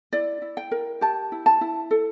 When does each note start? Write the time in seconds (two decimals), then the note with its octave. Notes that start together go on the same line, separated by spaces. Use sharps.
0.13 E4 D5
0.42 E4
0.57 G5
0.71 A#4
1.01 G4 A5
1.32 E4
1.46 A5
1.61 E4
1.91 A4